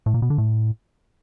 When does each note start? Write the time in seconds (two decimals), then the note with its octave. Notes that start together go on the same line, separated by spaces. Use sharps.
0.06 A2
0.14 A#2
0.22 B2
0.30 D3
0.38 A2